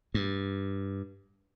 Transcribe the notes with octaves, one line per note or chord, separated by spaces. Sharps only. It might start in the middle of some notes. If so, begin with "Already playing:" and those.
G2